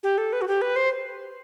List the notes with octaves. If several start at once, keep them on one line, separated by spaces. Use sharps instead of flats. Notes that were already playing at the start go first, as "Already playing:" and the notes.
G4
A4
B4
F#4
G4
B4
C5